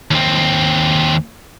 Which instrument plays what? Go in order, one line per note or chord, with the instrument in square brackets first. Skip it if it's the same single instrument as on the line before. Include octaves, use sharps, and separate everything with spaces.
[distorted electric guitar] D#2 C4